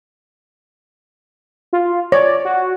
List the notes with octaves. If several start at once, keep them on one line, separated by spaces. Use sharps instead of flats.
F4
C#5 D5
F#4